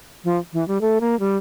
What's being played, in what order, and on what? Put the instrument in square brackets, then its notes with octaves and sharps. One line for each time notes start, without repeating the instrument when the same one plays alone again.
[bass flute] F3
E3
G3
A3
A#3
G3